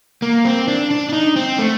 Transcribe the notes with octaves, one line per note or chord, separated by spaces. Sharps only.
A#3
C4
D4
D4
D4
D#4
C4
A3